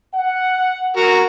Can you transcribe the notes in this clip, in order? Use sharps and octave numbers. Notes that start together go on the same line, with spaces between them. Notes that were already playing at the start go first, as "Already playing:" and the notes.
F#5
F#4 A#4